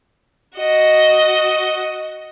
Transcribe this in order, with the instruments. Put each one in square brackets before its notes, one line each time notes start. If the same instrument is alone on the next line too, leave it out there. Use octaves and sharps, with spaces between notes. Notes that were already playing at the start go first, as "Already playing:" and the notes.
[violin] F#4 D#5